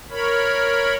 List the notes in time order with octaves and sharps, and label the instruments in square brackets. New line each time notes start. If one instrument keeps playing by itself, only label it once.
[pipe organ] A#4 C#5 B5